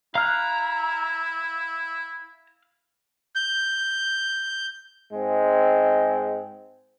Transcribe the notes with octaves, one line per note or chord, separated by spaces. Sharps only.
E4 F5 A#5 F6 F#6
G6
G#2 G#3 C4